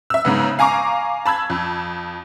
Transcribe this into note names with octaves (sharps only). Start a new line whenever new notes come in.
E5 E6
G#2 C#3 B3
F5 G#5 A#5 C#6 D6
A5 B5 E6 G#6
F2